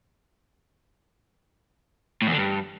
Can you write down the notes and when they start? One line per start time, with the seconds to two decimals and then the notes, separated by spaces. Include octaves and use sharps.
2.22 A2
2.27 E2
2.32 D3
2.37 G2